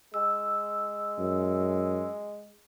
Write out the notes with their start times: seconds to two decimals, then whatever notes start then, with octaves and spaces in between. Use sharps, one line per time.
0.14 G#3 E6
1.18 F#2